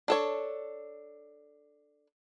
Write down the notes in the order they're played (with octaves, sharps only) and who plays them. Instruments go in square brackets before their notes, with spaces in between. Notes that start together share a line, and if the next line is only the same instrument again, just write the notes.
[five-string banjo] D4 A4 C#5